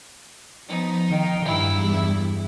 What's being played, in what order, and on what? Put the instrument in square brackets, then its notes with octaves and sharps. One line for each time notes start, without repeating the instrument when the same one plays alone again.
[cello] F3 B3 [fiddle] D#4
[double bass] D#3 [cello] F5 G5
[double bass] G2 [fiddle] E4
[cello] E2 G3